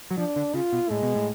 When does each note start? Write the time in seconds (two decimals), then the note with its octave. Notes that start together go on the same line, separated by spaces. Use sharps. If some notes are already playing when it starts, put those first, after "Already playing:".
0.11 F#3
0.17 F3 D4
0.36 D3
0.54 C#3 F4
0.72 B2
0.90 A2 G#3
1.03 B2
1.16 A2